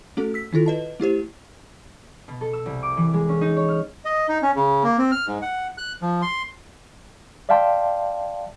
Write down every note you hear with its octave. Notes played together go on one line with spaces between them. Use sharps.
A3 C#4 F#4 A4
E6 B6
D#3 E4 F4 A4
B4 D#5 A5
A3 E4 G4 C5
B2
A4
E6
C2
D6
E3
G#3
C#4
D#4
C#5
F6
D#5
D#4
C#4
C#3
A#3
C4
F6
G#2
F#5
F#6
F3
C6
D5 E5 F5 G5 A5 C6